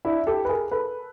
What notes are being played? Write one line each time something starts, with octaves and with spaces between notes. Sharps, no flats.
D4 E4
G4 A4
B4
G#4 A#4
A4 B4